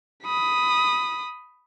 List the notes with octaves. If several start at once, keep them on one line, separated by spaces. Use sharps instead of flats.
B5 D#6